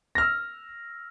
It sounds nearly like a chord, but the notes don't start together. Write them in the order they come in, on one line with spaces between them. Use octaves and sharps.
A#6 F6 E6